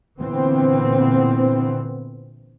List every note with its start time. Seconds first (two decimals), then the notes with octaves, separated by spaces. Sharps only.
0.20 A#2 D3 E3 B3 C4